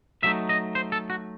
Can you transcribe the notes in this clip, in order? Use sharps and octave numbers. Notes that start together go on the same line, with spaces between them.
F#3 A3 D#4 E5
D#5
C5
A4
F#4